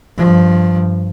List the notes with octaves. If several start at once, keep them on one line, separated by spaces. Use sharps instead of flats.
G2 F3